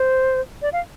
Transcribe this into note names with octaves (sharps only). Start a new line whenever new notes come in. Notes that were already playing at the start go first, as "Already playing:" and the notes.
Already playing: C5
D5
F5